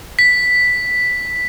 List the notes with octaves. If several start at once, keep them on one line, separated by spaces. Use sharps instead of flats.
B6